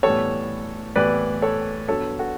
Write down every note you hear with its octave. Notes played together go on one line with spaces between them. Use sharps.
A2 E3 G3 B3 A4 C#5
A2 E3 G3 B3 B4 D5
A4 C#5
G2 F#3 B3 A4 C#5
F#4 A4